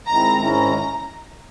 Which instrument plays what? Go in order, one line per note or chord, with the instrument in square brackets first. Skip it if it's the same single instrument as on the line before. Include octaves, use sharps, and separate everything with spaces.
[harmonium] D#3 G#3 C4 E4 [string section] A#5
[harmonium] G#2 D#3 G#3 C#4 E4 [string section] A#5